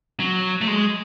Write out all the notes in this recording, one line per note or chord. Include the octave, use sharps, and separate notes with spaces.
F#3
A3
G#3